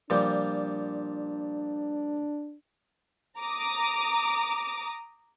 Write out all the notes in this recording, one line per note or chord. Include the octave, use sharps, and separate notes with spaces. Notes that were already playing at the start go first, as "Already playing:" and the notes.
A#2 F3 G3 D4
A#5 D6 D#6